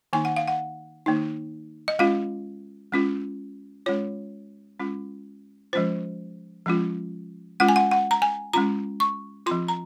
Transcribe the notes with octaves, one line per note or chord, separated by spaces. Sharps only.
D#3 A#3 D#4 G#5
F#5
F5
F#5
D#3 A#3 D#4
D#5
G#3 C#4 F4 F5
G#3 C#4 F4
G#3 C#4 F4 C#5
G#3 C#4 F4
F3 G#3 C#4 F4 C5
F3 G#3 C#4 F4
G#3 C#4 F4 F#5
G#5
F#5
F#5
A#5
G#5
G#3 C#4 F4 A#5
C#6
F3 C4 F4 C6
A#5